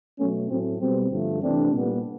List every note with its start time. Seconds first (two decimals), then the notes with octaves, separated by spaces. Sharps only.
0.19 B2 F#3 A3 B3 C#4
0.50 A2 F#3 A3 C4
0.81 B2 G3 B3 C4
1.11 G2 D3 F3 A3
1.43 C3 E3 A3 C4 D4
1.73 A#2 G3 B3